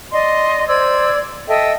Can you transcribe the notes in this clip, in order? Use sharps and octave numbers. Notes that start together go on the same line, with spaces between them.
D5 D#5 C6
C5 D5 E6 G#6
A4 D#5 E5 G5